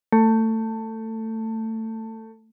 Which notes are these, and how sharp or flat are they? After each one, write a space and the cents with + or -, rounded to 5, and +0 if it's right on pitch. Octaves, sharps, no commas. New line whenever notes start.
A3 +20